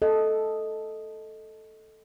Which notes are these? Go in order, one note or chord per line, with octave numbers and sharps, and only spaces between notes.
A4 D#5